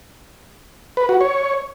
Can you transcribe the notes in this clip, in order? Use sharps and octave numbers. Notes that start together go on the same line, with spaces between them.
B4
F#4
C#5